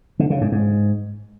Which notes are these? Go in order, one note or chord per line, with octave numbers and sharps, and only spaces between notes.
D3
C#3
G#2
G#2